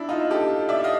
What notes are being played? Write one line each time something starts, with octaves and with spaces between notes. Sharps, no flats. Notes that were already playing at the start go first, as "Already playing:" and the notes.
Already playing: D4 E4
D#4 F4
G4 A4
D5 E5
D#5 F5